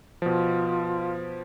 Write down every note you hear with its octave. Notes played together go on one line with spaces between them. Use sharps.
B2 F3 F4